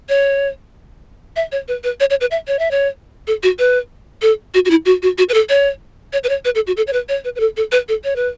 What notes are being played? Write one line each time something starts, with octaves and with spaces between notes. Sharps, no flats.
C#5
E5
C#5
B4
B4
C#5
C#5
B4
E5
C#5
E5
C#5
A4
F#4
B4
A4
F#4
F#4
E4
F#4
F#4
F#4
B4
A4
C#5
C#5
B4
C#5
B4
A4
F#4
A4
C#5
B4
C#5
B4
B4
A4
A4
B4
A4
C#5
B4